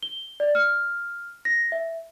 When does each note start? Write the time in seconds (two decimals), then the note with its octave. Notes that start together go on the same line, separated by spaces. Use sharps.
0.03 G7
0.40 D5
0.55 F6
1.45 A#6
1.72 E5